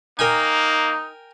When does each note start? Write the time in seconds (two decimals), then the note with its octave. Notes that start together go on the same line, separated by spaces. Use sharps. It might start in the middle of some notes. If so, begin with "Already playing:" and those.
0.19 A#3 D#4 A#4 G5 G#5